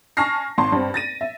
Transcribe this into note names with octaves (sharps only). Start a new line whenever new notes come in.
G#5 A5 C#6 F6 A#6 C7
G#1 A5 C6
G2 C4
A6 A#6 D#7
E5